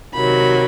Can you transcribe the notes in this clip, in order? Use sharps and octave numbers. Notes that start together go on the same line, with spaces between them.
C3 D#3 F#3 B5